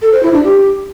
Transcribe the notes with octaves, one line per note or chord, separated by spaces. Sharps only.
A4
C5
E4
D4
G4